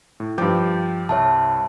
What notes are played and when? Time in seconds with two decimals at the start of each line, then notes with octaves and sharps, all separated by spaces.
0.20 A2
0.38 G2 F3 G5 D6 G6
1.09 C2 C#5 E5 A5